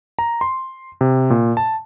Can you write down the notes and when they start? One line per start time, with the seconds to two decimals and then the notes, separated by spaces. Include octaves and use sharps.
0.19 A#5
0.41 C6
1.01 C3
1.30 A#2
1.57 A5